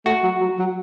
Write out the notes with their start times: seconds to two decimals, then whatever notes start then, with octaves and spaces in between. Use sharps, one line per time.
0.06 A3 F#4
0.24 F#3
0.40 F#3
0.59 F#3